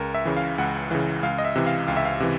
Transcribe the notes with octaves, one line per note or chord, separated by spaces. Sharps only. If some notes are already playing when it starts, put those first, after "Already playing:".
Already playing: C#2 A#4
E5
C#3 E3
F5
C#2 F#5
C#3 E3
C#2 F5
D#5
E5
C3 E3
F5
C#2 F5
E5
F5
C3 E3